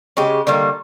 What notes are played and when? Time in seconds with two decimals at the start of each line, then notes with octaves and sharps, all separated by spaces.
0.17 C#3 G#3 G4
0.47 D3 D#3 G3 A#3